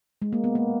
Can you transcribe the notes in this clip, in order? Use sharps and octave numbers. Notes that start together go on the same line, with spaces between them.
G#3
A#3
B3
A#3